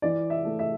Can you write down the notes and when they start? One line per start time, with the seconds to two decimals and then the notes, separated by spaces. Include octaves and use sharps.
0.02 E3 D5
0.30 E5
0.44 A3
0.59 E5